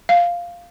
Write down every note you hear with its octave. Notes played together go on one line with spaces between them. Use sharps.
F5